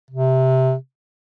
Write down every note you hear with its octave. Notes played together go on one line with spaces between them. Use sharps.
C3